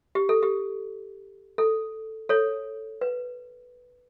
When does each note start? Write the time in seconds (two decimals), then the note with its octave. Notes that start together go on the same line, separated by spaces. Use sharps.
0.15 G4
0.29 A4
0.43 G4
1.58 A4
2.29 A4 C#5
3.01 B4